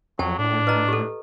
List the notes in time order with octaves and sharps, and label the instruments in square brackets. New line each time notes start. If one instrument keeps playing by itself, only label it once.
[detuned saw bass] F2 [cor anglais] F#3 [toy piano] G5 A5
[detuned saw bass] A2 [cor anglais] D4
[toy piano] B4 D#5 A#5
G4 A4